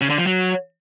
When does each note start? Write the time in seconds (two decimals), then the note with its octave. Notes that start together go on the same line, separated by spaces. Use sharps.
0.01 C#3
0.10 D3
0.18 F3
0.27 F#3